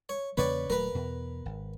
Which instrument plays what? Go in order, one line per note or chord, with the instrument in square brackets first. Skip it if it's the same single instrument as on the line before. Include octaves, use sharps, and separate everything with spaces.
[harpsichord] C#5
[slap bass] E2 C#3 A#3 [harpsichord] B4 C#5 D5
[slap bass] D#1 F#3 A3 [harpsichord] A#4 B4
[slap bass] E2 B2
G#1